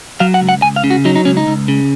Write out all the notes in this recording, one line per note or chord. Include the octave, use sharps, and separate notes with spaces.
F#3 F5
F#5
C#2
F#5
C#2 G#5
F5
C#3
F#4
F#3 D#4
D#4
C#2 C#4
D#4
C#2
C#3